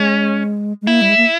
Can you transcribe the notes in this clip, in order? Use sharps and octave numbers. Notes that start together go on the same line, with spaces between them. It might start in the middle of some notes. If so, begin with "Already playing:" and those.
Already playing: G#3 C#4
G#3
A#3 E4
G3
G#3
A#3